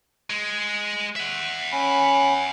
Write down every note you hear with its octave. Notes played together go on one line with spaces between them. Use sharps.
G#3
E5 F#5
C#4 B5